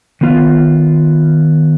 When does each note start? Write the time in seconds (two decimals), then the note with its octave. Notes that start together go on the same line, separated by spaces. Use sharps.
0.21 D#3 B3 F4